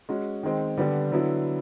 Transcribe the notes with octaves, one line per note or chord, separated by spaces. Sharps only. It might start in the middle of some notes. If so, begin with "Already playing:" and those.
G#3 C#4 F#4
D#3 G#3 C4
D3 G3 B3 D4
D3 F#3 B3 E4